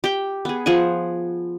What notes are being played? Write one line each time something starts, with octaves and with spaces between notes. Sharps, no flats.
G4 G5
B3 G#4
F3 G#4 F#5 G#5